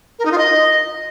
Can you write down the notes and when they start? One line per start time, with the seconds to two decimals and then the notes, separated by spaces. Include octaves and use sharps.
0.19 A#4
0.25 D#4
0.32 F4
0.38 D#5